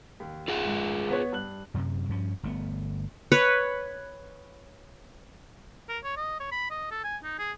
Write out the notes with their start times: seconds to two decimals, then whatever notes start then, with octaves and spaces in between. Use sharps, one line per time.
0.20 D#2
0.48 F4 G#4 F#5
0.65 G#2
1.08 B3 B4 C#5
1.33 G2 F#6 F#7
1.74 F#2 C3
2.09 G2 F3 C#4
2.43 G1 A3 B3
3.32 B4 C#5
5.89 A#4
6.04 C#5
6.17 D#5
6.40 C#5
6.52 B5
6.70 D#5
6.91 A4
7.04 G#5
7.24 D#4
7.39 G#4